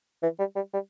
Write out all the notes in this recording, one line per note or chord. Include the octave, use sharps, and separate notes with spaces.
E3
G3
G3
G3